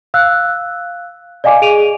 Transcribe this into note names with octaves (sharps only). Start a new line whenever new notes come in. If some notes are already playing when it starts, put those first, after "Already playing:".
F5 E6 F#6
D5 D#5 F5 G#5 D6
G#4 D7 D#7 F7